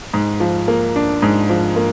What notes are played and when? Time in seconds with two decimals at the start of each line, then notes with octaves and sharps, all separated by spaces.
0.14 G#2
0.40 F3
0.68 A#3
0.96 D4
1.22 G#2
1.49 F3
1.76 A#3